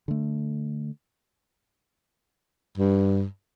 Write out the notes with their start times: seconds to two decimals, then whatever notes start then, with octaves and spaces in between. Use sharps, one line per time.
0.08 D3 A3
2.78 G2